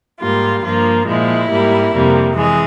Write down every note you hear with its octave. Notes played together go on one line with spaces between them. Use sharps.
G#2 G3 A#3 F4
G2 F3 A#3 F4
A#2 F3 G#3 E4
G#2 G3 A#3
F2 C3 G3 A#3
E3 G#3 G#4